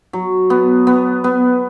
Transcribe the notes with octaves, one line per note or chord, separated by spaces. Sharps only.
F#3
B3
B3
B3